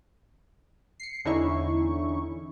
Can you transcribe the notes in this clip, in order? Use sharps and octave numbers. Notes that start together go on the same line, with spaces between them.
C7 C#7
E2 D3 C#4 D#4 E4 C#6